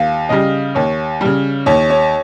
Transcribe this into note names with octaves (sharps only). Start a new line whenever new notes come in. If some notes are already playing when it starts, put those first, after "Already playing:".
Already playing: D#2 F5
C#3 G3 D#5
D#2 C#5
C#3 G3
D#2 C#5
C#5